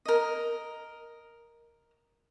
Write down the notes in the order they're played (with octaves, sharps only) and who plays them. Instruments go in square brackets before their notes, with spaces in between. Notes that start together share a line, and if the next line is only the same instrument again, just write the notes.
[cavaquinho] A#4 D#5